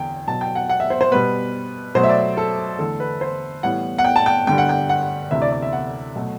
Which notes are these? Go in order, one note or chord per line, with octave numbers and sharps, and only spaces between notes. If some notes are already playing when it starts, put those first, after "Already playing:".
Already playing: E2 D3 G5
B2 F#3 B3 A5
G5
F#5
F#5
E5
C5
C5
B2 G3 B3 B4
B2 F#3 A3 C5
E5
D5
A4
E2 D3 A3 A4
B4
C5
A2 E3 G3 B3 F#5
F#5
G5
A5
G5
G2 D3 G3 G5
F#5
G5
F#5
D2 C3 E3 A3 E5
D5
D5
E5
F#5
B2 F#3 A3